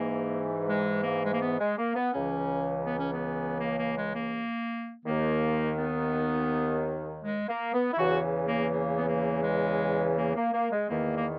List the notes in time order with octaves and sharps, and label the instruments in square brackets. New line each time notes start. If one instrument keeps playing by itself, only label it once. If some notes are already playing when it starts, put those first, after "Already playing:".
Already playing: [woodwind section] G#2 E3 A#3
G#3
A#3
G#3
A#3
B3
G#3
A#3
B3
C#2 C#3 E3 C#4
B3
C#4
B3
A#3
A#3
G#3
A#3
D#2 D#3 A#3
B3
G#3
A#3
B3
E4
E2 C#3 E3 F#4
A#3
A#3
B3
A#3
G#3
A#3
A#3
A#3
G#3
E2 D#3 A#3
A#3